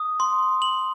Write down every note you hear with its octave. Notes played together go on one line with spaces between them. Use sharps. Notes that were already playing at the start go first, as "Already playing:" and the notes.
Already playing: D#6
C6
F#7